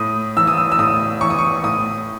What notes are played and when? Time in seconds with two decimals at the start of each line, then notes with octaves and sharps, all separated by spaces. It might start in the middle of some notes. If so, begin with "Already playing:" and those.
Already playing: A2 D#6
0.37 E3 E6
0.47 D#6
0.57 E6
0.72 E6
0.78 A2 D#6
1.21 E3 C#6
1.30 D#6
1.39 C#6
1.64 A2 D#6